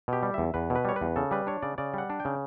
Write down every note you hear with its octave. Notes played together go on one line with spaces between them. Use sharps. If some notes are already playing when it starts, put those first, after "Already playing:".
B2 G4
G3
E2 E5
E2 B4
B2
B4
G3 C#5
B4
E2
C#3 A4
G3 B4
D4 C#5
C#3 D5
C#3 D5
G3 F#5
D4
G5
C#3